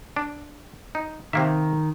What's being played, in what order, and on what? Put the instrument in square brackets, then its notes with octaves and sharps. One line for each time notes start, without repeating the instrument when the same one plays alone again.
[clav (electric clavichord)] D4
D#4
[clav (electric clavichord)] C3 A#3 E5 [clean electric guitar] D#3